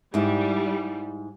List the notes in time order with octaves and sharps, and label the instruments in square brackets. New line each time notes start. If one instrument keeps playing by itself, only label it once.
[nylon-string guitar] G#2 E4 [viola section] G3